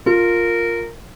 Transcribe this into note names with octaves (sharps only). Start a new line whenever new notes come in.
F4 A#4